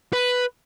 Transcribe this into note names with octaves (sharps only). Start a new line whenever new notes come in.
B4